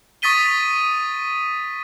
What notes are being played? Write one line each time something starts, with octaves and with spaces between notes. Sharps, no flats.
C#6 D#6 A6 B6 D#7 G7